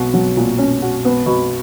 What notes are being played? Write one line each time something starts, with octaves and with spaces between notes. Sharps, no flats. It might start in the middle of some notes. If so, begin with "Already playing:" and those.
Already playing: B1 B2 F#4
F#3
A#2
C#4
F#4
B3
B2